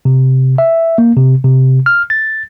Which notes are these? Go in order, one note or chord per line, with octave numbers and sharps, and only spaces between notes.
C3
E5
A#3
C3
C3
F6
A6